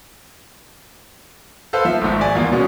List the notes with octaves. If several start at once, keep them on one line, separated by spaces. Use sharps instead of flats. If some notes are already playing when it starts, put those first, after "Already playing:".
A4 B4 C5 F5
F3 E5
G#1 G#2
D5 G#5
E2 A#3 F4
B2 G#3 C#4